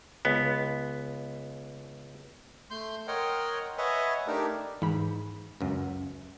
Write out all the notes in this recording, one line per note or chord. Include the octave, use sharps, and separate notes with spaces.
C#2 B3
A3 C6 G6
A#4 C#5 D#5 F#5 G5 C6
B4 C#5 D#5 E5 F#5 G#5
A3 D4 D#4 G4 A#4 D5
G#2 E3 B5
C#2 F#2